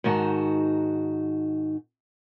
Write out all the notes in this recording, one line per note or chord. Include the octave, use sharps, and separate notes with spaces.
G#2 D#3 D#4 F#4 A5